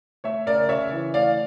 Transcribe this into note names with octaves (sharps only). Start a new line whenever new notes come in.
A3 C#5 E5
C#3 A#4 D5
C#3 C#5 E5
E3
A3 D5 F5